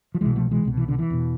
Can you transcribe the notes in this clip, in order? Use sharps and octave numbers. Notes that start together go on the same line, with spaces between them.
F3
C2 B2 E3 G#3
F3 A3
E3 G#3
C2 B2
E3
D3
E3
E2 B2